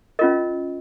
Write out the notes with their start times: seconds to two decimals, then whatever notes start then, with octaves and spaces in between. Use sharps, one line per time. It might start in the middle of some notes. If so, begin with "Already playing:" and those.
0.19 C#4 F4 A#4 D#5